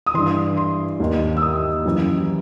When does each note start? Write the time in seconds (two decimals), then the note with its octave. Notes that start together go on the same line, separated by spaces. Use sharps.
0.06 D#6
0.14 G2 E3 C6
0.57 C6
1.00 D#2 D#3
1.37 E6
1.42 D#6
1.85 F#2 E3